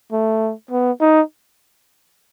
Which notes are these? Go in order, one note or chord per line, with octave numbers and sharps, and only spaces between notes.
A3
B3
D#4